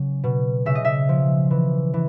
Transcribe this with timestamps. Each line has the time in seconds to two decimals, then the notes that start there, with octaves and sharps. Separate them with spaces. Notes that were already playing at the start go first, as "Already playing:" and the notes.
Already playing: C#3 F#3
0.24 B2
0.66 C#3 E5
0.75 D#5
0.85 E5
1.09 F3
1.50 E3
1.94 E3